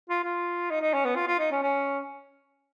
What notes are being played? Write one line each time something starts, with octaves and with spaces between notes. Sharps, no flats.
F4
F4
D#4
D#4
C#4
B3
F4
F4
D#4
C#4
C#4